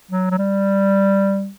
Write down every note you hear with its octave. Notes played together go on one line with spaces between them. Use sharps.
F#3
F#3
G3